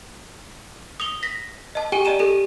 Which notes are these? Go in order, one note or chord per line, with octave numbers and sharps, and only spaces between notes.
D#6 F7 G7
A#6 B6
D#5 A5
G4 G#4 G5 G#5 D#7 G7
D5 D#5 A#5 D#7 E7
G4 A4 D#7